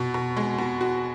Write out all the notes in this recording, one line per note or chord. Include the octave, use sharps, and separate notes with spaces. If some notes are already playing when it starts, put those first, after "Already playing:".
Already playing: B2
B2
G#3
B2
F#4